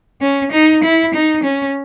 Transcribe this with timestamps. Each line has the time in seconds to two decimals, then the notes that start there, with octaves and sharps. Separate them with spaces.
0.21 C#4
0.52 D#4
0.83 E4
1.13 D#4
1.43 C#4